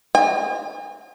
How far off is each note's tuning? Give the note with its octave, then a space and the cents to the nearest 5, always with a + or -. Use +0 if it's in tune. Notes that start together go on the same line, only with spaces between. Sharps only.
G#5 -45